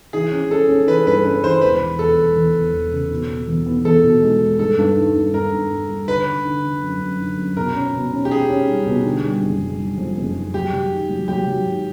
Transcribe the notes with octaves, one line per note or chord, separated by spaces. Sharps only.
E3 G#4
C#4
C#4 A4
C#4
E3 B4
G2 B4
C#4 B4
E3 C5
E1 B4
E1
E1 A4
E1
E2
E1
E1
C#3
B2
B3
E2
B3
E2 A4
B2
G#3
G#3
G2 A4
G2
D#3
G2
G2 A#4
G2
G2
G3
D3 B4
D3
D3
D3
F#2
F#2
D3
F#2
B2 A#4
C#4
B2
C#4
G4
C#4 G#4
C#4
G3
B2
D3
G3
F#1
G3
G3
F2
F#1
F#1
F#3 G4
F#3
D#3
F#3
F#3 G4
F#3
G#2